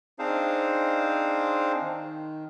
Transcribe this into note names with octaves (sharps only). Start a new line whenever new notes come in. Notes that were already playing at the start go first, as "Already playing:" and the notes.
C4 D4 D#4 G#4 C5 F5
D#3